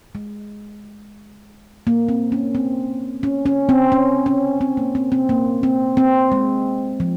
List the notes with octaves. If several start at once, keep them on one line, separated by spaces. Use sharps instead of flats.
G#3
A#3
C4
C#4
C4
C#4
C#4
C4
C#4
C#4
C4
A#3
C4
C4
A#3
C4
C4
G#3
F3